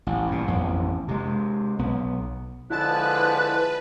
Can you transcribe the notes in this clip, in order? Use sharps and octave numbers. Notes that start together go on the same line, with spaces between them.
A1
G2 A#2
A1 F2 B3
C3 G#3
B1 B3
D3 F3 G#3 E4 B4 A5 F#6 A6